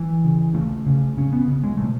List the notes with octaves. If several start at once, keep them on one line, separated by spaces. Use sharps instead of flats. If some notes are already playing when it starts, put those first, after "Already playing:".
Already playing: E3
C#3
C#3 A3
C#3
C#3 C#4
B3
C#3
G#3
B2 A3